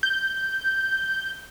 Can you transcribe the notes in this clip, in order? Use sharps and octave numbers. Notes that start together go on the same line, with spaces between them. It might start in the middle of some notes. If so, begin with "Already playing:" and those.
G6